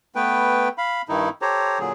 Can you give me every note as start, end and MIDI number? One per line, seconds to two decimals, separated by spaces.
0.15 0.69 57
0.15 0.69 59
0.15 0.69 71
0.15 0.69 79
0.78 1.02 77
0.78 1.02 83
1.09 1.29 43
1.09 1.29 51
1.09 1.29 63
1.09 1.29 64
1.42 1.79 67
1.42 1.79 69
1.42 1.79 72
1.42 1.79 73
1.42 1.79 82
1.79 1.93 46
1.79 1.93 50
1.79 1.93 54
1.79 1.93 68